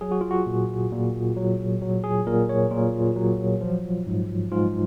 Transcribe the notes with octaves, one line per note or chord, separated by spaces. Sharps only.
F#3 G#4
F#4
F4
F#4
A#2
A#2
F#3
F#3
G#4
A#2 A#4
C#5
A#2 F4
F#3
F3
G#2
G#2 F4